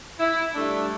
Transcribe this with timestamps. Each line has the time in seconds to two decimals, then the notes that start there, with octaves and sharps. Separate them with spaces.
0.20 E4
0.55 G3 A3 D4